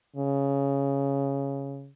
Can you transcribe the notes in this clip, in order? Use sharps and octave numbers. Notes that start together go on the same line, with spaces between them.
C#3